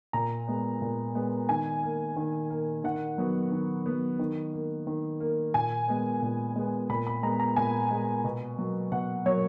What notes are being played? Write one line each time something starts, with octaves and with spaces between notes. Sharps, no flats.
A#2 A#5
G#3 B3
A#2
G#3 B3
D#3 G#5
A#3
D#3
A#3
D#3 F#5
F#3 B3
D#3
F#3 B3
D#3
A#3
D#3
A#3
A#2 G#5
G#3 B3
A#2
G#3 B3
A#2 B5
B5
G#3 B3 A#5
A#5
A#2 G#5
G#3 B3
B2
F#3 A#3
B2 F#5
F#3 A#3 C#5